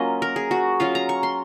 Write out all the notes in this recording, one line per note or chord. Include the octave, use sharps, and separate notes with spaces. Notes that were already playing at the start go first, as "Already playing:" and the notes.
Already playing: F#3 A#3 C#4 F4 D#5
A#4
G#4
F#4
F#3 C#4 F4 F5
A#5
C#6
C6